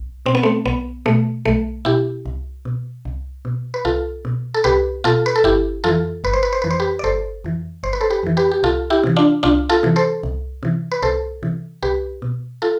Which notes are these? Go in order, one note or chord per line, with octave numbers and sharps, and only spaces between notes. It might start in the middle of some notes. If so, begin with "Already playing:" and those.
Already playing: B1
B2 C4
B3
A3 C4
B1 B3
B2 A3
B1 A3
B2 E4 G4
C2
B2
C2
B2
B4
C2 F4 A4
B2
A4
C2 G4 B4
B2 F4 A4
B4
A4
G1 E4 G4
F2 E3 F4 A4
G1 B4
C5
B4
C5
F2 E3 B4
C5
G4 B4
D5
G1 A4 C5
F2 E3
G1 C5
B4
A4 C5
G4 B4
F2 E3
G4 B4
G4
C2 F4 A4
E4 G4
C3 E3
D4 F4
C2 D4 F4
F4 A4
C3 E3
A4 C5
C2
C3 E3
B4
C2 A4 C5
C3 E3
C2 G4 B4
B2
F4 A4